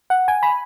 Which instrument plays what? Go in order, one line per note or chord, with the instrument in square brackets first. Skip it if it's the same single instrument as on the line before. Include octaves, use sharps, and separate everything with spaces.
[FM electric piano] F#5
G#5
B5